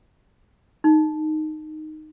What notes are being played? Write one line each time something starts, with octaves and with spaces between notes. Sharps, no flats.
D#4